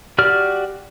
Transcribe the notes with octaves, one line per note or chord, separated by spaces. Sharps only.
F#4 G4 D5 F6